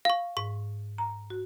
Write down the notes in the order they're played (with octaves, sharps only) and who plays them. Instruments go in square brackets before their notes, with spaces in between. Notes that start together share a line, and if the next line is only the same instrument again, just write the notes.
[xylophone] F5 C#6
[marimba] G#2 [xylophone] C#6
[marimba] A#5
F#4